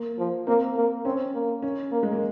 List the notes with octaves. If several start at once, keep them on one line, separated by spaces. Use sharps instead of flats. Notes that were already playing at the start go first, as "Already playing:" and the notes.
Already playing: A#3
F3
A#3 C4
A#3
C4 C#4
A#3
C#4
A#3
G#3
A#3